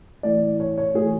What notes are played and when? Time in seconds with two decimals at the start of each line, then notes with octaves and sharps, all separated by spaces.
0.23 A2 E3 D5
0.60 C#5
0.78 C#5
0.94 A2 E3 G#4